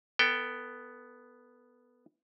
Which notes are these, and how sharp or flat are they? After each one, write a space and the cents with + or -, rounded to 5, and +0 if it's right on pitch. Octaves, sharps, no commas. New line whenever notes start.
B3 +0 A4 +25 G5 +0